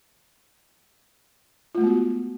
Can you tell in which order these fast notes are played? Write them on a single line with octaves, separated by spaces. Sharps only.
F4 A3 G#3 B3 F#4